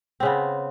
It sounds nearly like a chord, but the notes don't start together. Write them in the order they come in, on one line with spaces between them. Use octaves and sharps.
C4 C#3 B3